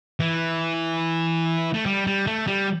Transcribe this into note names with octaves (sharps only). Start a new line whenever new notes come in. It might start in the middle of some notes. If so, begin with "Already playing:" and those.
E3
A3
G3
G3
A3
G3